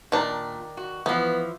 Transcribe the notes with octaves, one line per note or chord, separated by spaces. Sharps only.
A#2 D#3 D4
F#4
E3 F3 B3